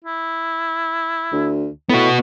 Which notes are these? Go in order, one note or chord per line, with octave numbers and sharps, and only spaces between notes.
E4
D2
A2 B3 F#4